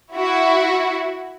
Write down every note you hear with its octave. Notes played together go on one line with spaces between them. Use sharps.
E4 F#4